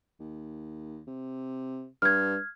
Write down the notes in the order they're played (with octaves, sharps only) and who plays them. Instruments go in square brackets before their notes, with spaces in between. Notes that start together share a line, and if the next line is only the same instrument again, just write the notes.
[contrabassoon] D#2
C3
[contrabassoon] G2 [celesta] F6 G#6